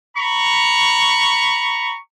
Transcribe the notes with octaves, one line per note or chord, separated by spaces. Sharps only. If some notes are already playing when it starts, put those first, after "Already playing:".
A#5 B5 C#6